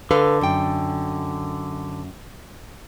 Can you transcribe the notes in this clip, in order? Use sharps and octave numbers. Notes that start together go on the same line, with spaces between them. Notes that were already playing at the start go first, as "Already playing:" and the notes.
D3 A4 B4 F5
F#2 G5